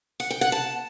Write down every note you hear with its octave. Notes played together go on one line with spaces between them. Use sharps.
F#5
G5
F#5
A5